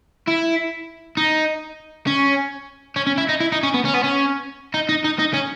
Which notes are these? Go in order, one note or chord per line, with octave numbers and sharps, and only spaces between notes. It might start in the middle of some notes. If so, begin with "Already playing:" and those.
E4
D#4
C#4
C#4
C#4
E4
D#4
E4
D#4
C#4
B3
C#4
B3
C#4
D#4
D#4
D#4
D#4
C#4